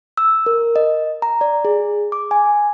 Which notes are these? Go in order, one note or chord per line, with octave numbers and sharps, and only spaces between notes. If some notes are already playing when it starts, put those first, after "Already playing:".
E6
A#4
D#5
A#5
D5
G#4
D6
G#5